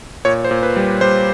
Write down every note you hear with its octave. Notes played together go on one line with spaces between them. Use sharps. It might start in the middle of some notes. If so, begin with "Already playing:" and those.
A#2 C#5
C5
A#2
B4
G3
G3 C5